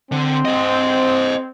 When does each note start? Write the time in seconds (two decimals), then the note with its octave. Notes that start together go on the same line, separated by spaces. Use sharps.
0.12 D3 C4
0.45 C5 D#5